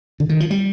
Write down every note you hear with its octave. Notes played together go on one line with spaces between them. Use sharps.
D3
D#3
F3
G3